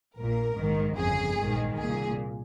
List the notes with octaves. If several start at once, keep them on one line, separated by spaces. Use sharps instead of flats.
A#1 A#2 A#4
A#1 G#2 D#3
G1 F2 C#3 G#4
A#1 G#2 D#3
C2 A#2 G#4